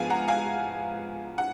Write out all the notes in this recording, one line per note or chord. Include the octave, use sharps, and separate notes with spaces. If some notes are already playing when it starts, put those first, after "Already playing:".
Already playing: G#2 F3 B3 F5 G#5
F#5 A#5
F5 G#5
F#5